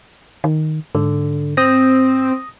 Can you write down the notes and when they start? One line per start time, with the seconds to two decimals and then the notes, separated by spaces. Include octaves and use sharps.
0.44 D#3
0.95 G#2 D3
1.57 C4 D#6 A#6